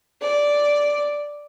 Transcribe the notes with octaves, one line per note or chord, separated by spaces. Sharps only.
D5